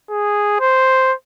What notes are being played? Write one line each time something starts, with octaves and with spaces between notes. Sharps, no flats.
G#4
C5